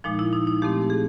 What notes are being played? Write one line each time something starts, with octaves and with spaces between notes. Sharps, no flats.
A#2 F3 G#3 D#4
E4
D#4
D#4
A#2 F3 A3 C4 G4
G#4